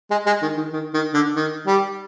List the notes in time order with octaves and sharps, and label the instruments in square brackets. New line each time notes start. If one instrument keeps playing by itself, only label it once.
[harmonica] G#3
G#3
D#3
D#3
D#3
D#3
D3
D#3
G3